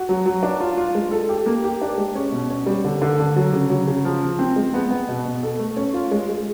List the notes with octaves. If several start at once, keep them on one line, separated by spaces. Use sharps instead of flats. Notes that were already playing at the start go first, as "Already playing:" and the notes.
Already playing: F#4
F#3
F#3
D4
F4
F4
G#3
A4
G4
A#3
G4
D4
G#3
C#4
B2
C#4
G3
D3
D3
D3
F#3
C#3
F#3
C#3
F3
F3
C4
G#3
B3
B3
B2
B2
A4
A3
C#4
F4
G#3
G#3